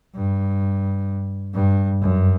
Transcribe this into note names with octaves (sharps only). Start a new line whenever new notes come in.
G2
G2
F#2